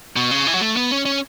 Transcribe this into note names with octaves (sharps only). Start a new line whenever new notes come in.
B2
C#3
E3
F#3
A3
B3
C#4
C#4